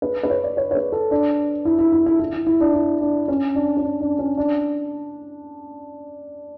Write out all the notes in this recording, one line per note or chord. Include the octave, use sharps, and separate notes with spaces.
B4
B4
C#5
D5
C#5
C#5
B4
A4
D4
E4
E4
E4
E4
E4
E4
E4
D4
E4
D4
C#4
D4
C#4
D4
D4
C#4
D4